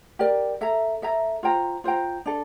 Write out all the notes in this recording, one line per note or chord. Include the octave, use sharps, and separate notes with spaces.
G4 A#4 D5
A4 E5 A#5
A4 E5 A#5
F4 C5 G5 A#5
F4 C5 G5 A#5
D4 A4